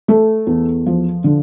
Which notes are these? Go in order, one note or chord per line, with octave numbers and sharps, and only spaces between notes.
A3 A4
E2
F3
D3